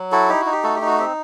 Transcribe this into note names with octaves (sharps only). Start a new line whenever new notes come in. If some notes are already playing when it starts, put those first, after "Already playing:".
Already playing: F#3
E4 F#4 A4
D#4 G4
D#4 F#4
G4
A3 F#4 A4
G4
D#4 F#4
C4 G4